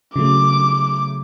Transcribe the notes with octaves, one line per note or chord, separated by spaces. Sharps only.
C#3 F#3 A3 D6